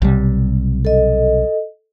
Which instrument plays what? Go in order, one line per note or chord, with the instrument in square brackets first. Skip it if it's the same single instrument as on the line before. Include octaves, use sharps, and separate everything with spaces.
[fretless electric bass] B1 C3 G3
[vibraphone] A4 D#5